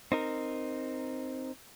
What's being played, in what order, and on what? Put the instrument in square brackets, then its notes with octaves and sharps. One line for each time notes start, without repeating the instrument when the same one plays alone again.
[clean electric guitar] C4 D#4 A#4